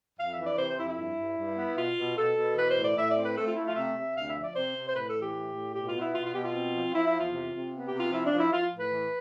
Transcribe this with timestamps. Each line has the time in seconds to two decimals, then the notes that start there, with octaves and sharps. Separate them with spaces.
0.18 F2 F5
0.32 E5
0.38 E3
0.45 D5
0.58 C3 C5
0.69 C5
0.78 F2 E4
0.88 E4
0.97 G2
1.17 G2
1.38 G2
1.58 B3
1.77 B2 F4
1.97 B2
2.16 B2 A4
2.36 B2
2.56 E3 B4
2.70 C5
2.76 A2
2.83 D5
2.96 A2 E5
3.09 D5
3.16 C4
3.22 B4
3.36 A3 A4
3.46 F4
3.55 A3 E4
3.66 F4
3.75 C3 E5
3.96 C3
4.15 D2 F5
4.28 E5
4.36 F3
4.42 D5
4.55 C3 C5
4.74 C3
4.88 C5
4.95 A2 B4
5.07 A4
5.14 E3
5.21 G4
5.35 A2
5.54 A2
5.73 B2 G4
5.87 F4
5.94 B3
6.01 E4
6.13 B2 F4
6.24 F4
6.33 B2 G4
6.44 F4
6.53 C4
6.74 F3
6.93 F3 E4
7.06 E4
7.13 E2
7.19 F4
7.33 C3
7.52 C3
7.73 B3
7.85 G4
7.92 C3
7.98 F4
8.12 F3 E4
8.25 D4
8.32 F3
8.38 E4
8.51 F3 F4
8.72 A2
8.78 B4
8.91 E3